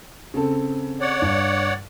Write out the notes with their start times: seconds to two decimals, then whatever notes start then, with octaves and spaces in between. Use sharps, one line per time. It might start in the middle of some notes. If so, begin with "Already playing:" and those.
0.34 C#3 C4 A4
1.01 C#5 D5 F#5
1.22 G2